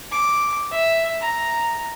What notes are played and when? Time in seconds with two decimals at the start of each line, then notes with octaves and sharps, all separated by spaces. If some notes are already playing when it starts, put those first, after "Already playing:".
0.11 D6
0.71 E5
1.21 A#5